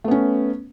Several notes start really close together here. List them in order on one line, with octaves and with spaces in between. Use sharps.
A3 B3 C#4